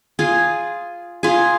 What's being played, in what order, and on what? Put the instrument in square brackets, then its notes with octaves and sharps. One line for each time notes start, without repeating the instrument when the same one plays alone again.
[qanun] F4 G#4
F4 G#4